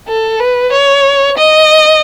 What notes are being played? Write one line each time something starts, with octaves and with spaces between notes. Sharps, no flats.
A4
B4
C#5
D#5